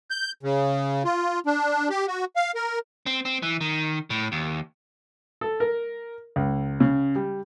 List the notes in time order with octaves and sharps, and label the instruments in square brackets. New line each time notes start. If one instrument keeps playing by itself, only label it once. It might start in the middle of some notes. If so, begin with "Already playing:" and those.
[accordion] G6
C#3
F4
D4
G4
F#4
F5
A#4
[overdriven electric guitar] C4
C4
E3
D#3
A2
D#2
[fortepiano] A4
A#4
C#2
C#3
G3